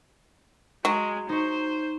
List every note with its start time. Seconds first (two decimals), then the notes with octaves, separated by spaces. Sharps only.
0.85 F#3 G#3
1.29 D#4 C5 C#5